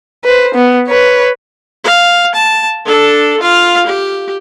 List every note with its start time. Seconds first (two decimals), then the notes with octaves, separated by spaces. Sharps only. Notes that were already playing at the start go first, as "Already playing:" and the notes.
0.24 B4 C5
0.55 B3
0.88 B4 C#5
1.84 F5
2.35 A5
2.85 D4 A4
3.40 F4 F5
3.86 G4